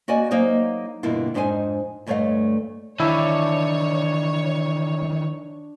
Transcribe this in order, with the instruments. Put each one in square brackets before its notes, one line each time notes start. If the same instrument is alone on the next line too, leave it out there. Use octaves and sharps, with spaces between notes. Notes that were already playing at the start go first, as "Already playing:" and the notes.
[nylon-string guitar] A#3 F#4 D5 D#5 G#5
F#3 A#3 D#4 G#4 C5 D#5
G2 B2 D3 A#3 E4 F4
F2 G#2 D4 D#4 C5 G#5
D2 G2 A3 C#5 D#5 F5
[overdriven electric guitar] D#3 E3 [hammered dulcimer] D4 A5 [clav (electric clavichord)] E4 E5 [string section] C#5